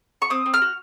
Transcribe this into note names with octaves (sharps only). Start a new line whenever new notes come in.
C#6
C4 D#6
C4
F6
F#4